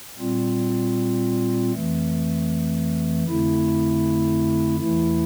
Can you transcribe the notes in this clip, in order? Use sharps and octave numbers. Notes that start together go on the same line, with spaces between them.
A#2 G3 C4 F4
F2 E3 A3
F2 D3 A3 E4
E2 E3 A3 E4